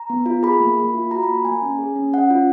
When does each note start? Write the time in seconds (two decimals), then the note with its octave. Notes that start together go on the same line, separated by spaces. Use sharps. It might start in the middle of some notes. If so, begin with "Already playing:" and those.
Already playing: A#5
0.10 B3
0.26 F4
0.43 G#4 B5
0.60 A#3
0.78 A#3
0.94 F4
1.11 F#4 A#5
1.23 B5
1.28 A#3
1.34 A#5
1.45 A#3 G#5
1.62 C#4
1.79 G#4
1.96 C#4
2.13 C#4 F#5
2.30 F4